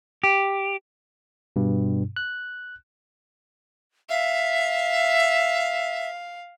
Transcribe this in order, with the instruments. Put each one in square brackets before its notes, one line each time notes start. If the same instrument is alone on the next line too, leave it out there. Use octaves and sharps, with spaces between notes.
[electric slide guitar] G4
[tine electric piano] G2 B2
F#6
[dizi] E5 [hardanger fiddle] F5